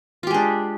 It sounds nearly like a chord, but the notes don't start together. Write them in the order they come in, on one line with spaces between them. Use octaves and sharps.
F4 G4 G#3 D4